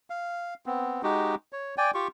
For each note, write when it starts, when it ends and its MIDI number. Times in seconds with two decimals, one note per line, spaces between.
0.10 0.54 77
0.66 1.02 59
0.66 1.02 60
1.03 1.35 56
1.03 1.35 63
1.03 1.35 66
1.03 1.35 67
1.53 1.75 73
1.78 1.91 74
1.78 1.91 79
1.78 1.91 80
1.94 2.08 65
1.94 2.08 67
1.94 2.08 85